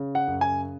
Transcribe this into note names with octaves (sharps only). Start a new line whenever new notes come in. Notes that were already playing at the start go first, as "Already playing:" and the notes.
Already playing: C#3
F#5
F#2
G#5